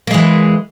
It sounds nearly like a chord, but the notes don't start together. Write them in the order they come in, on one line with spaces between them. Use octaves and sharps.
A#3 G#3 E3